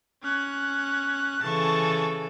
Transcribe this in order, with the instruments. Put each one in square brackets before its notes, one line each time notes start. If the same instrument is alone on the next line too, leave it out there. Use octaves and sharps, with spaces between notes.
[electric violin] C#4 F#6
[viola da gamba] C#3 E3 A4 [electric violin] A5 C#6